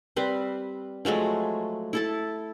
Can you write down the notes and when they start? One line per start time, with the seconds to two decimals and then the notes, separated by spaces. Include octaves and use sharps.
0.16 G3 C4 B4 C5
1.05 F3 F#3 G#3 A3
1.93 E4 A4 A5